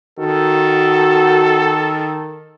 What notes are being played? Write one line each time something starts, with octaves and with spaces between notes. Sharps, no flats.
D#3 F#4 A4